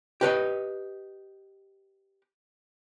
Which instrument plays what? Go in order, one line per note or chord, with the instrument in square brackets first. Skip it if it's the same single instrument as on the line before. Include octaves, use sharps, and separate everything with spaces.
[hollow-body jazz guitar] G4 B4 C#5 D#5